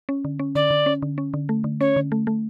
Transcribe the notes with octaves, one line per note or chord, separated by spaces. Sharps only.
C#4
D3
C#4
D3 D5
D3
C#4
D3
C#4
D3
A3
D3
C#4 C#5
D3
A3
A3